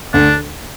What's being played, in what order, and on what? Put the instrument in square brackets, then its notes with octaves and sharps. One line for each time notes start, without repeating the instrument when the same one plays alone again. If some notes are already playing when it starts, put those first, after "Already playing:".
[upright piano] D2 D3 [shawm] D4